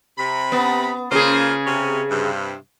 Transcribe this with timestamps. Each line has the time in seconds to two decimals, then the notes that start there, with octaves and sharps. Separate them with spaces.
0.19 C3 B5
0.52 B3
1.12 C#3 A#3 F4 G#4 C5
1.67 C3 C#4
2.11 G2 C3